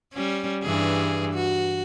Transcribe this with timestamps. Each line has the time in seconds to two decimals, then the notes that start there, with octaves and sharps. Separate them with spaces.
0.13 G3 C#4
0.63 G2 E3 G#4
1.34 F#4